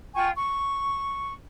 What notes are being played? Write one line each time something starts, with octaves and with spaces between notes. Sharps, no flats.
F4 G5 G#5 C#6
C#6